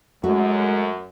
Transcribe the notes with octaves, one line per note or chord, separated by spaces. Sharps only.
F#2 G#3 A3 E4 F#4